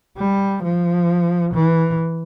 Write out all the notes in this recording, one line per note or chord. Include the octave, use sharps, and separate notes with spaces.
G3
F3
E3